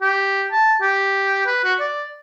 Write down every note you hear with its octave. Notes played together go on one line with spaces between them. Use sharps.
G4
A5
G4
B4
F#4
D5